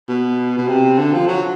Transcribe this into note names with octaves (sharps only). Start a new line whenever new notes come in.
B2
B2
C3
D3
F3
F#3